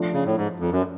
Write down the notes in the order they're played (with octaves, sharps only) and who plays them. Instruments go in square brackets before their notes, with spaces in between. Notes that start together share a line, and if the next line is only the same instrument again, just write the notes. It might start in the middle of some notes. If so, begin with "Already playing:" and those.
Already playing: [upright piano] F3 A3 D4
[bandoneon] C#3
A2
G#2
F2
F#2